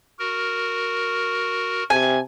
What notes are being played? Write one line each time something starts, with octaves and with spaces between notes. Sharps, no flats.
F#4 A#4
C3 G#5